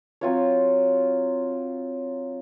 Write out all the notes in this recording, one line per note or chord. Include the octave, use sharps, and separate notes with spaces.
F#3 C4 F4 C#5